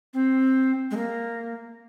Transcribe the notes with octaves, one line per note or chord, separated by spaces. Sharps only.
C4
G#3
A#3